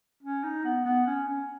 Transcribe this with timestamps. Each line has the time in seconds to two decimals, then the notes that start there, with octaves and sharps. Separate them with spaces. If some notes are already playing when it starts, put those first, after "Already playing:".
0.22 C#4
0.43 D#4
0.64 B3
0.85 B3
1.06 C#4
1.27 C#4